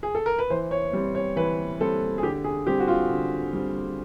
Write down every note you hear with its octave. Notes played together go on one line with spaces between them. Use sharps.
G#4
A4
A#4
B4
E3 C5
C#5
G3 C4
C#5
E3 B4
G3 C4 A4
G#4
D3 G4
G#4
G3 C4 G4
F#4
F4
D3
G3 C4